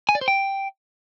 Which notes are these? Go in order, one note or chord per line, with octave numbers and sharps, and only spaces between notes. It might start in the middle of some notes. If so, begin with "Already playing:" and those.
G#5
D5
C5
G5